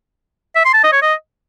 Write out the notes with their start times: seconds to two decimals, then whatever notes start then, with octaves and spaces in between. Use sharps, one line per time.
0.56 E5
0.65 C6
0.74 A5
0.84 D#5
0.92 C#5
1.03 D#5